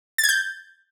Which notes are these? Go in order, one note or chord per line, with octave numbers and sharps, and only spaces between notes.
A6
G#6
G6